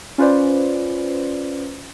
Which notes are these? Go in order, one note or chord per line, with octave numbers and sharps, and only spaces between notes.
C#4 F4 B4 C5 D5